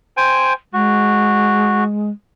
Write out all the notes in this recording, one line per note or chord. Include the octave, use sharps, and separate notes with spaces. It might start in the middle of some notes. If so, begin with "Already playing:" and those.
C5 G5 G#5
G#3 F#4